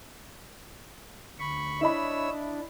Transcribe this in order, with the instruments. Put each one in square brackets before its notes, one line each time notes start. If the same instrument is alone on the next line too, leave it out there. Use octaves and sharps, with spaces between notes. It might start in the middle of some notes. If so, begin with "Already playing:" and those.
[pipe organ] D2 B5 C#6
[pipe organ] D4 C#5 E6 [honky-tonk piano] E4 D#5 B5
[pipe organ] D4